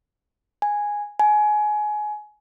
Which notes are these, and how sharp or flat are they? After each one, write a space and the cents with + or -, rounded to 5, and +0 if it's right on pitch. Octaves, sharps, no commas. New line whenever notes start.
G#5 -5
G#5 +25